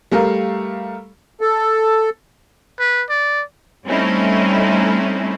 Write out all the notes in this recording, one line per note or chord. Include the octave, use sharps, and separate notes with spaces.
G3 A3 A#4 F5
A4
B4
D5
G3 A3 C4 C#4 D#4 E4